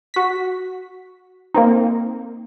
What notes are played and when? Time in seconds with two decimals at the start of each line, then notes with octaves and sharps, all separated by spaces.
0.14 F#4 B6
1.54 A#3 C4 D#4